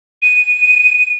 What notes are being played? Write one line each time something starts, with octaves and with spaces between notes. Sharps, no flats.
D#7